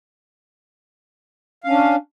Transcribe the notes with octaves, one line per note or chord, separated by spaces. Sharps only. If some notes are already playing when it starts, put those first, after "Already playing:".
C#4 D4 F5